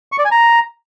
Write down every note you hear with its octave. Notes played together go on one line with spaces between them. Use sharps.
C#6
D5
G#5
A#5